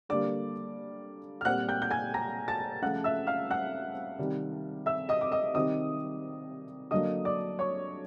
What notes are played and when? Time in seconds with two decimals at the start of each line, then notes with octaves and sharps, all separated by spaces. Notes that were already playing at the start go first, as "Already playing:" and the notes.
0.09 D3 G3 A#3 D5 D6
1.41 F6
1.45 A#2 G3 C4 F#5 F#6
1.68 G5 G6
1.82 G6
1.91 G#5 G#6
2.14 A#5 A#6
2.48 A5 A6
2.82 C#3 F3 A3 F#5 F#6
3.04 E5 E6
3.27 F5 F6
3.51 F#5 F#6
4.18 C3 D#3 G3
4.86 E5 E6
5.09 D#5 D#6
5.21 D6
5.32 D#5 D#6
5.54 C3 D#3 G3 C4 D#5 D#6
6.91 D3 F#3 A#3 D#5 D#6
7.25 D5 D6
7.59 C#5 C#6